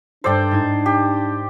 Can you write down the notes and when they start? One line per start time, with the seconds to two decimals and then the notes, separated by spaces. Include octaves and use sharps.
0.24 G2 D4 A4 C5 D5 G5
0.51 G#2 D#4 G#6
0.86 G4